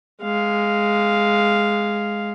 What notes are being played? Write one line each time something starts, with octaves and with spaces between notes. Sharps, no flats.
G#3 F5